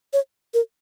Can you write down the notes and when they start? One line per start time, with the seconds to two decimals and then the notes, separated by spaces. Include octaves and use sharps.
0.13 C#5
0.54 A#4